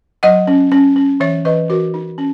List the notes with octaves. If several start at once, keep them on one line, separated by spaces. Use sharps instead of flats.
F#3 D#5 F#5
C#4
C#4
C#4
E3 C#5 E5
E3 B4 D#5
E3 F#4 A#4
D#4
C#4